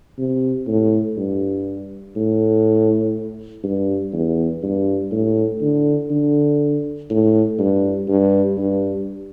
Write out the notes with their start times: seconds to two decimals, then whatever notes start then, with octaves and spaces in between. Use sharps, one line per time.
0.18 C3
0.68 A2
1.17 G2
2.16 A2
3.64 G2
4.13 E2
4.63 G2
5.12 A2
5.62 D3
6.10 D3
7.10 A2
7.59 G2
8.08 G2
8.57 G2